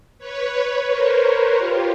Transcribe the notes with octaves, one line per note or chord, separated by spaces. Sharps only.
B4 C#5
A#4 C5
F4 G4